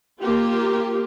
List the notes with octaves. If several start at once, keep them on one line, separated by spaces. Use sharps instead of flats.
A#3 F4 G4